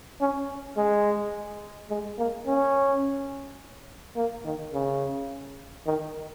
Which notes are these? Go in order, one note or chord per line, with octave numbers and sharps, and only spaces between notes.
C#4
G#3
G#3
A#3
C#4
A#3
D#3
C#3
D#3